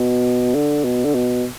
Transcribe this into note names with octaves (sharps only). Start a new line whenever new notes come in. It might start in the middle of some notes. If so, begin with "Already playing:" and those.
Already playing: B2
D3
B2
D3
B2